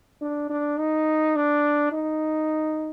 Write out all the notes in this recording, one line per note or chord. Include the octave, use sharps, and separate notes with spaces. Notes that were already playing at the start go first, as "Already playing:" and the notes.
D4
D4
D#4
D4
D#4